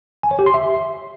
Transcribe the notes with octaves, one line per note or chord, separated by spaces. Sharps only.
G#5
C#5
G4
C6
E5